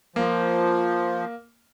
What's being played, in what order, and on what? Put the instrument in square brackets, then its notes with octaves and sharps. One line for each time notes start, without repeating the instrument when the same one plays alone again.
[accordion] F3 [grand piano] A#3